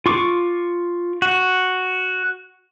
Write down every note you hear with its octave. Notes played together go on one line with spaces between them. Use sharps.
F4 C#6 D6
F#4